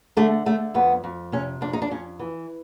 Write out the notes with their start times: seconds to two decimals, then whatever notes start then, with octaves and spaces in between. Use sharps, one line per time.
0.17 D3 A3
0.46 D3 A3
0.74 F2 B3
1.04 F2
1.32 C3 C#4
1.61 F2 D4
1.73 D#4
1.82 D4
1.91 F2 C#4
2.19 E3